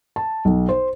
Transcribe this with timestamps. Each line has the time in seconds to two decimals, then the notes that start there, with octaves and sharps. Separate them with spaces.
0.16 A5
0.45 B1
0.69 C5